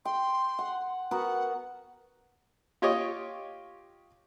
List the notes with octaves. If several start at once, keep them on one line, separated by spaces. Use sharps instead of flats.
G5 C6
F#5
B3 F#4 A#4 F#5
F4 G4 C#5 D#5